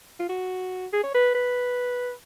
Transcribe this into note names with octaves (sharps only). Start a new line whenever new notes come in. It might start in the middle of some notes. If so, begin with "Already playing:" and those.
F4
F#4
G#4
C#5
B4
B4